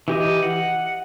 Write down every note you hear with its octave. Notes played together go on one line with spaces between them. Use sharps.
E3 G4 D#5
F#5